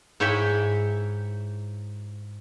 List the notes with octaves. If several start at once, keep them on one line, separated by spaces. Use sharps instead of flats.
G#2 E4 C#5 G5 G#5 B5